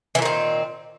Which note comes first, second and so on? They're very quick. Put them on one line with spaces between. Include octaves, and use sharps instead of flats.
E3 A#2 D#3 C4